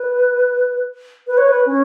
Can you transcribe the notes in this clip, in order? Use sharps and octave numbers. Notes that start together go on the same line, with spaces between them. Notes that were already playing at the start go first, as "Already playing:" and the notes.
Already playing: B4
B4
C#5
B4
C#4